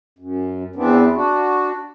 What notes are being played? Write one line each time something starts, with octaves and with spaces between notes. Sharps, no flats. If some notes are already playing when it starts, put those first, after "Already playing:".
F#2
E2 E3 B3 C4 D4
D4 F#4